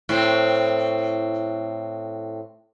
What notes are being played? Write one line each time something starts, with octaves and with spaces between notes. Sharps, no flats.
A2 C4